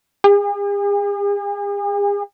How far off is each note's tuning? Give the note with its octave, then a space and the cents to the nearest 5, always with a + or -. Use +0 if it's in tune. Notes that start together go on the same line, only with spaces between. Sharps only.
G#4 -45